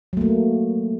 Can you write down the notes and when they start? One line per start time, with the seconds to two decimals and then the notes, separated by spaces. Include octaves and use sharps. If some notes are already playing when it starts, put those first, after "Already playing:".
0.13 F#3
0.17 A3
0.21 A#3